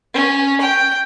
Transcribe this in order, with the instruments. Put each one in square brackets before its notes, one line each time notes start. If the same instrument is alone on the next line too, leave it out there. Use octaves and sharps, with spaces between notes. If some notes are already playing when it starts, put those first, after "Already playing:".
[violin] C#4
G5